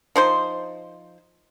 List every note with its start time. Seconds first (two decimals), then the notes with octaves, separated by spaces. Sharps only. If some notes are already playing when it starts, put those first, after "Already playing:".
0.16 F3 D#4 C5